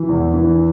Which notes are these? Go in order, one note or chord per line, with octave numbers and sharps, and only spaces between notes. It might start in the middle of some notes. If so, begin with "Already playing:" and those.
Already playing: E3
E2
E3